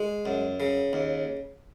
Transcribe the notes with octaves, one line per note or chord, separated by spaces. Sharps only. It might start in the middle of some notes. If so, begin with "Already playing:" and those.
Already playing: G#3
F#2
C#3
D#2